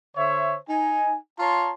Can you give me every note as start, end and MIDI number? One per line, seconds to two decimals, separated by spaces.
0.16 0.56 50
0.16 0.56 72
0.16 0.56 73
0.16 0.56 76
0.69 1.15 63
0.69 1.15 80
1.39 1.71 65
1.39 1.71 73
1.39 1.71 81
1.39 1.71 82
1.39 1.71 84